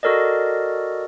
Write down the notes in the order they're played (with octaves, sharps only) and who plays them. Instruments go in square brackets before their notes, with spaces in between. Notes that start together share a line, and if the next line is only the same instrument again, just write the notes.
[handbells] F#4 A4 A#4 D5 D#5